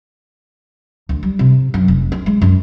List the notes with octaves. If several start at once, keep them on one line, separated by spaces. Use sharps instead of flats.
D2
G3
C3
F#2
F1
C#4
G#3
F#2